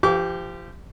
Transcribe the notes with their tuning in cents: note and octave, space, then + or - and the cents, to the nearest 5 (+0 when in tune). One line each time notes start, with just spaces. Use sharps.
F3 -35 G4 +0 D6 -35